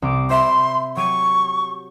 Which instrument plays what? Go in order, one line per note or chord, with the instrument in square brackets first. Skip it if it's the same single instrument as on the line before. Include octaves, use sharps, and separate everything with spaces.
[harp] C2 D6
[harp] C5 E5 B5 [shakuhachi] C6
[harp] F#3 G4 D#7 [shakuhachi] C#6